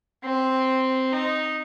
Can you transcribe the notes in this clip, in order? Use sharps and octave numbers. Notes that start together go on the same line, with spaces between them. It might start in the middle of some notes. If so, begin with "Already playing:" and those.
C4
D#4